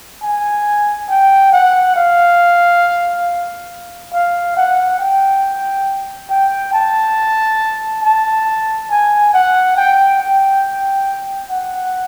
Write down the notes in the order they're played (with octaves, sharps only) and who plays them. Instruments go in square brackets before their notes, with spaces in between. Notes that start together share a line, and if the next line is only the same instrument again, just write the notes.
[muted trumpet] G#5
G5
F#5
F5
F5
F#5
G5
G5
A5
A5
G#5
F#5
G5
G5
F#5